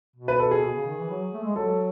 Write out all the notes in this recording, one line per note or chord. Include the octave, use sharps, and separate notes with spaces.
B2
B4
A4
G#4
B2
C#3
D#3
E3
F#3
A3
G#3
F#3 A4